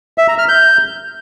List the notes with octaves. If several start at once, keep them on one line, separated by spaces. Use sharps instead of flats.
E5
A#5
F6
G6